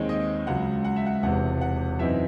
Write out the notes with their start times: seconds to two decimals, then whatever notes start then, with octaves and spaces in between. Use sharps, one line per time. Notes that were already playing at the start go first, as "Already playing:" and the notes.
Already playing: D#2 D#3 G#3 C4 D#4 C#5
0.09 D#5
0.47 C#2 C#3 F#3 F#5
0.85 F#5
0.96 E5
1.06 F#5
1.23 E1 E2 C3 F#5
1.61 F#5
1.99 F#2 E3 C4 D#4 E5